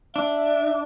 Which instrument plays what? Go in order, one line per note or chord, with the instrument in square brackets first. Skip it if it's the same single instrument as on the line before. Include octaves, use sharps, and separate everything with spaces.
[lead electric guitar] D4 [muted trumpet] E5